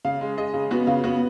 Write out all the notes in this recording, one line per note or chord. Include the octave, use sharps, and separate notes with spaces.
C#3 F5
G#3
G#3 D#5
C#3
B3 F#4
C#3 F4
B3 F#4